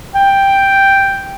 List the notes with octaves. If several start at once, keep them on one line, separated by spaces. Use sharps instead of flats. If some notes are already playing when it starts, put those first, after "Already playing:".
G5